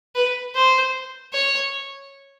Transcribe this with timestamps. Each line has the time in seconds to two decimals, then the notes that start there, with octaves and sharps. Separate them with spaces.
0.15 B4
0.55 C5
1.33 C#5